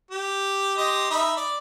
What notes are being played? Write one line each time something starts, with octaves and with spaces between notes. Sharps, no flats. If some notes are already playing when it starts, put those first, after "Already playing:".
G4
G4 D#5 C6
D#4 E5 B5
D5